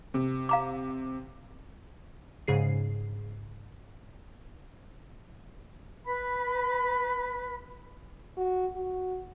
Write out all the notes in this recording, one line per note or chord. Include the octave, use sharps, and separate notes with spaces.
C3
F5 A#5 D6
G#2 C#3 G#4 C7
B4 B5
F#4
F#4